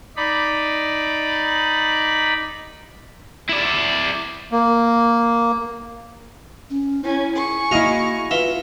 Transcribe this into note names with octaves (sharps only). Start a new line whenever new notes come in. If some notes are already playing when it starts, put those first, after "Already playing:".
D#4 D5 B5
E4 D5
A#3
C#4
C#4 E4
G#4 C#6
A#3 E4 F#4 D#5 F5 A#5
F4 B4 E5